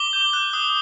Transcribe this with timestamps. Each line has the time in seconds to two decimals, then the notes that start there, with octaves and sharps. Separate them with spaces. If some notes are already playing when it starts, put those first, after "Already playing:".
Already playing: D6 G7
0.13 G6
0.33 F#6
0.53 D#6